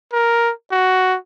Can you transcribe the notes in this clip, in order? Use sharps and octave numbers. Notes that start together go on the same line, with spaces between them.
A#4
F#4